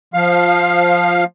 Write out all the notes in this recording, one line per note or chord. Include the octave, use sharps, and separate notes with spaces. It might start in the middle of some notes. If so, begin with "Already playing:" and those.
F3 F5